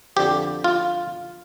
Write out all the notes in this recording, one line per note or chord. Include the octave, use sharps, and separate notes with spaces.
F2 D3 F3 G4
F4